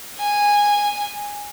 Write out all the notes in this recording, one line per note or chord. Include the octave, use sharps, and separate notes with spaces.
G#5